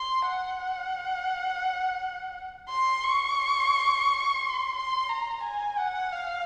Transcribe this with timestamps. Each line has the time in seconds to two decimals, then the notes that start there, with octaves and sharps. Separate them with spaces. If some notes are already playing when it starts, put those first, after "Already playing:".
Already playing: C6
0.28 F#5
2.69 C6
3.03 C#6
4.41 C6
4.75 C6
5.09 A#5
5.43 G#5
5.78 F#5
6.12 F5